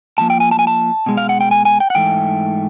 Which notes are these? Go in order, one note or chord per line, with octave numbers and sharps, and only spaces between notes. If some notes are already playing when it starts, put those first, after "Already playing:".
A#2 F3 A#3 A5
G5
G#5
A5
G#5
A5
B2 G#3
F5
F#5
G5
G#5
G#5
G5
F#5
G#2 E3 A3 G5